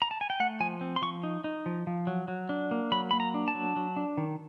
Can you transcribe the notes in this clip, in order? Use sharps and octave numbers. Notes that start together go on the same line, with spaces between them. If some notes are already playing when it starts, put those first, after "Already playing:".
A#5
A5
G#5
G5
A3 F#5
F3 G#5
C4
C6
F3 C#6
D#4
D#4
F3
F3
F#3
F#3
D4
A#3
F#3 B5
A#3 B5
A#5
D4
A5
F#3
F#3
D4
D#3